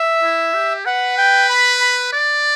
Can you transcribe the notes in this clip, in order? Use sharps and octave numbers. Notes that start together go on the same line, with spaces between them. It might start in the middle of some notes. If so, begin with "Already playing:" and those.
Already playing: E5
E4
G4
B4 F#5
G5
B5
B5
D5